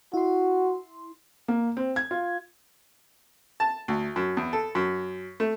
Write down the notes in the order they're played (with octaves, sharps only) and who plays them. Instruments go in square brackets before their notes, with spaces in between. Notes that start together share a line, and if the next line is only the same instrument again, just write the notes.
[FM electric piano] E4 C6 [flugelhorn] F#4
[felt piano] A#3
C4
G#6
F4
[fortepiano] A5
D2
F#2
E2
A4
F#2
A3